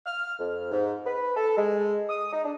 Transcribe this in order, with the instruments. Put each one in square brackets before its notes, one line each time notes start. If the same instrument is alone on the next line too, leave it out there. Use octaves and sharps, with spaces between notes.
[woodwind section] F6
F2
G#2
B4
A4
G#3
D#6
D#4
D4